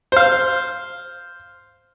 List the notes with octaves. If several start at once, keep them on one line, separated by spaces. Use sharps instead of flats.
C5 F5